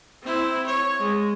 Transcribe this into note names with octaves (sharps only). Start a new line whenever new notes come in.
C4 E4
C#5
G#3